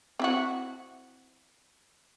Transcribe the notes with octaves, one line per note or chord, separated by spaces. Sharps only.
C4 E4 F#4